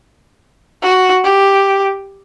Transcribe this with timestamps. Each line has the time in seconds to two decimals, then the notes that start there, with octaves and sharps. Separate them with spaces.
0.82 F#4
1.24 G4